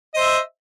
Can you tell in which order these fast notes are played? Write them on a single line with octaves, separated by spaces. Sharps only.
D#5 C5 E5